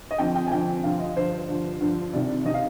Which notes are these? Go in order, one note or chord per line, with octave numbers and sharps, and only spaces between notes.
D#5
F2 D3 F3 G5
G5
G#5
F2 D3 F3 G5
G2 D3 F3 F5
D#5
G2 D3 F3 C5
G2 D3 F3
G2 D3 F3
C2 C3 D#3 D5
C3 D#3 D#5
F5